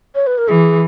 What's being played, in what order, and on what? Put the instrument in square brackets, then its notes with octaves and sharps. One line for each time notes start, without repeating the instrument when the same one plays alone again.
[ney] C#5
B4
A#4
[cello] E3 [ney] G#4